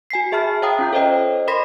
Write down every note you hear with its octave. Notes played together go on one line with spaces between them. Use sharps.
F#4 G#5 B6 C7
G#4 E5 A5 B5 F6
C#5 E5 F5 G5 A#5 D#6
C#4 F4 G6
A4 C5 C#5 D#5 G5
A#4 D#5 B5 C6 A#6 B6